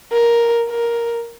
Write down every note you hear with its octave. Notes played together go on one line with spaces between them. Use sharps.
A#4
A#4